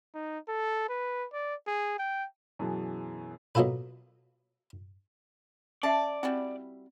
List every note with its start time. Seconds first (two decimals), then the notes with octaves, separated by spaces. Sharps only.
0.15 D#4
0.49 A4
0.89 B4
1.33 D5
1.67 G#4
1.99 G5
2.59 F#2 B2 E3 G#4 A5
3.55 B2 F#3 A#3 F4 A4 B4
5.83 C#4 D5 E5 A5
6.23 G3 C4 E4 F#4